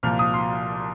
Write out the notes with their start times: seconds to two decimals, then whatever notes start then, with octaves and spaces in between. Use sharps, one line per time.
0.03 C2 A#2 F3 F6
0.19 D#6
0.34 C6